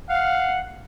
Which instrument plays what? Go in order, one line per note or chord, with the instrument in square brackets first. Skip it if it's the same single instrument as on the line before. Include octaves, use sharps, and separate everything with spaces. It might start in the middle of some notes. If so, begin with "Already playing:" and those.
[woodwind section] F5 [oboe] F#5